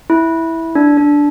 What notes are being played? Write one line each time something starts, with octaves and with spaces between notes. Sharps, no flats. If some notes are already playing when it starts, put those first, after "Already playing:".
E4
D4
D4